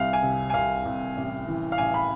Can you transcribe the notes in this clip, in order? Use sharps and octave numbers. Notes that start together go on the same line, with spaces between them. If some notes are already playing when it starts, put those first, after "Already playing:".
Already playing: C2 F5
G#5
C3
G#5
C2 F5
C2
A1
E3
F5
A1 G#5
B5